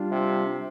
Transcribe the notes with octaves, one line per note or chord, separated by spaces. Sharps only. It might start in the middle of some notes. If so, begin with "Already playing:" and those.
Already playing: G3 D4 F4
C3